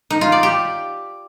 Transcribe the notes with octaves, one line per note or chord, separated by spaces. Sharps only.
D#4
F4
D5
G4